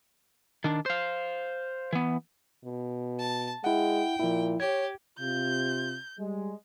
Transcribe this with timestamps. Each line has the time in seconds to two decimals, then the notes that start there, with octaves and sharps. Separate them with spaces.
0.64 D#3 D4
0.86 C5 F5
1.93 E3 B3
2.65 B2
3.19 A5
3.64 G#3 E4 F#5 G5
4.20 A#2 F3 E4
4.60 G4 C#5 G#6
5.19 C3 F4 G6
6.17 G3 G#3